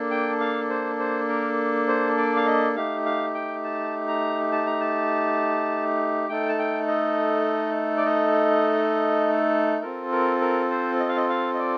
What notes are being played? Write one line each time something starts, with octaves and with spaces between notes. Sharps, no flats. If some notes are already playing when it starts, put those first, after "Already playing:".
Already playing: A#3 D4 A4
G5
F5
C5
C5
A#4
C5
D5
F5
D#5
A3 D#4 G4 F5
F5
G5
A5
A#5
A5
A#5
A5
A3 D#4 A4 G5
A5
G5
D#5
D5
D#5
C4 F4 A4 A#4
A#4
A#4
C5
D#5
F5
D#5
F5
D#5
D5